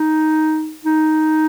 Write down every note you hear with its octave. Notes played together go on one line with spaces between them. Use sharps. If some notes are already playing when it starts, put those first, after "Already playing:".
Already playing: D#4
D#4